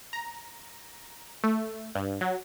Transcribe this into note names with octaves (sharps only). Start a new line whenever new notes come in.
A#5
A3
G2
F#3